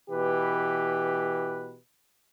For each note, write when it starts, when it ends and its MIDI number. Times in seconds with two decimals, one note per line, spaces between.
0.11 1.77 47
0.11 1.77 52
0.11 1.77 67
0.11 1.77 71